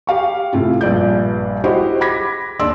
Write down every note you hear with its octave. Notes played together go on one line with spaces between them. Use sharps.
G4 F5 C#6
A2 C3 F4
A#1 G2 D5 G6
E4 F#4 G4 C5 D#5
B5 D6 G#6 A#6 B6
D#2 D4 D5 C6 E6